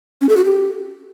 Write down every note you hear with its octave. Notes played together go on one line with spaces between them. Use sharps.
C#4
A4
F#4
G4